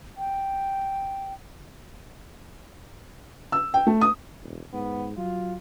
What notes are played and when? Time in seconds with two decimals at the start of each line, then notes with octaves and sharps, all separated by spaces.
0.18 G5
3.52 E6
3.74 G5
3.87 A3
4.01 D#6
4.43 E1
4.73 G#2 B3
5.17 F#3 F4